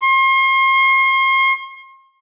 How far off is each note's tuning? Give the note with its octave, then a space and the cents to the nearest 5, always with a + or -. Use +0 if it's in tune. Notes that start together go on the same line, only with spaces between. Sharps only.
C6 +40